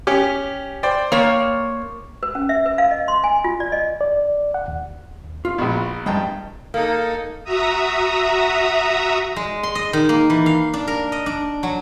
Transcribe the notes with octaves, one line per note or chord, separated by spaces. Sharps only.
C#4 G4
C5 D5 G5
A#3 C#5
B4
C#4
E5
B4
F5
D#5
C6
G#5
F4
D5
D#5
D5
F#5
D#2
F4
A#1 B2
G2 G#3 D#5 G5 A5 A#5
A#3 D#4 A4
F#4 E5 A#5 D#6
G#3
C6
D#5
D#3
A#3
E3
F5
D4
A#4
D#5
D4
F#3